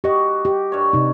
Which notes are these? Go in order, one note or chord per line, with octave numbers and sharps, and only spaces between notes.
F#4 G4 D#5
G4
G2 C#5
C3 D#4